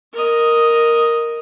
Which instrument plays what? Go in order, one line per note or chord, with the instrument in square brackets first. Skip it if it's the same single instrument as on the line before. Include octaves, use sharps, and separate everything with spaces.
[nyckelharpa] A#4 D#5